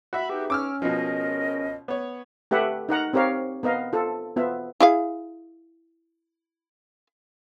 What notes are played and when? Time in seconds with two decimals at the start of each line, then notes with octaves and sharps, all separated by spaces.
0.13 F#4 E5 B5
0.29 B3 D#4 G4 G#4
0.50 C#4 D6 E6 F6
0.82 C#2 B2 F3 A#4 D#5
1.88 B3 C#5
2.51 A3 G4 B4 E5 F#5
2.89 D#4 A#4 F#5 A#5
3.13 C4 G4 A#4 C#5 F5
3.63 B3 A#4 D#5 F5
3.93 F4 A4
4.37 B3 F4 E5
4.80 E4 G#4 F5